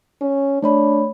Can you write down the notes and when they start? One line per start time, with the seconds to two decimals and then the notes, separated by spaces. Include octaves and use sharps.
0.21 C#4
0.62 A3 D4 C#5 B5